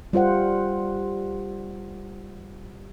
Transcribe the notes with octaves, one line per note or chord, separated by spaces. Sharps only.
G3 F4 C5 F#5